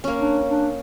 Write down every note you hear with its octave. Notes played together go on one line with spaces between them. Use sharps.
A#3 C#4
D4
D4